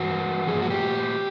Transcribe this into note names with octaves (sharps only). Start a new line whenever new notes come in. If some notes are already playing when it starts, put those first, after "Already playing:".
Already playing: G2 E3 F#4
A#2 F3 G#4
F#4
G4